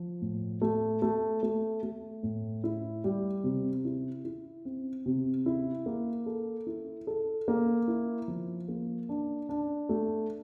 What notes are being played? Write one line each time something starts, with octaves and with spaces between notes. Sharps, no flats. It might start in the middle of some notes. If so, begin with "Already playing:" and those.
Already playing: F3
A2
A3
A3
A3
A3
A2
E4
G3
C3
E4
E4
C4
C3
E4
A#3
A4
E4
A4
A#3
E4
F3
A#3
D4
D4
A3